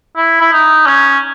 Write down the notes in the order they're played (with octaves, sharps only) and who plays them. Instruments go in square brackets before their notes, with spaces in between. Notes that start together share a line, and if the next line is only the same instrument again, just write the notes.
[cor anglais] E4
E4
D#4
C#4